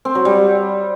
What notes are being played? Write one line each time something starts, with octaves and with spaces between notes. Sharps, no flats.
C4
F#3
G3